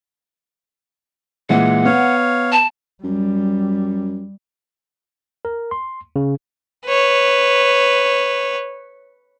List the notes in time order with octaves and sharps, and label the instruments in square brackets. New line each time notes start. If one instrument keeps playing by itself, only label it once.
[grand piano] A#2 E3 G#3 [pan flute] F#5
[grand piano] B3 [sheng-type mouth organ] C#5 F5
[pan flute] A5
[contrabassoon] F#2 [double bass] G3
[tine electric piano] A#4
C6
C#3
[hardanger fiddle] B4 C#5